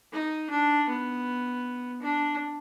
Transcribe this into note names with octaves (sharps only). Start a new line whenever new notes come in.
D#4
D4
B3
D4